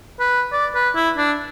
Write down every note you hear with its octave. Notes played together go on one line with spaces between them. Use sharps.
B4
D5
B4
E4
D4